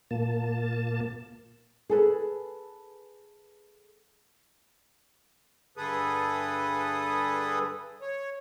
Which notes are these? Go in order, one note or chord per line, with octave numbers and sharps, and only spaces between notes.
A#2 A#3 A5
G#4 A4 B4
G2 D3 G#4 A4 B4 D#6
C#5